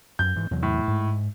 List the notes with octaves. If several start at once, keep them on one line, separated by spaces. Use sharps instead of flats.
F#2 G6
G#2 E3
E2 C3 F#3
A2
G#2